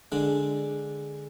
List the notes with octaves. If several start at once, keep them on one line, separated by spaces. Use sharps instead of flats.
D3 G#3 D4